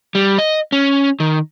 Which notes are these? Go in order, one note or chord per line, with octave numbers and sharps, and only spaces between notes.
G3
D#5
C#4
D#3